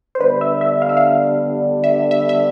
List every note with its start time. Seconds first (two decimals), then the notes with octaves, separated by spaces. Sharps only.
0.15 C5
0.20 D3 G3 B3 D4 B4
0.41 E5
0.61 E5
0.82 F5
0.89 E5
0.97 F5
1.84 E5
2.11 E5
2.29 E5